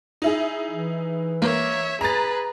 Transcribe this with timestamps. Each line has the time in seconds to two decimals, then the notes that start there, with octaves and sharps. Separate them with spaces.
0.22 D#4 E4 G#4
0.70 E3
1.42 A#3 C#5 E5
2.01 G#4 B4 A#5 A6